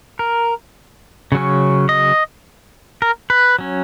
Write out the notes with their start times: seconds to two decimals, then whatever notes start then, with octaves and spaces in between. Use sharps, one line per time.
0.19 A#4
1.32 C#3 F#3 C#4
1.89 D#5
3.02 A#4
3.30 B4
3.59 F#3 C#4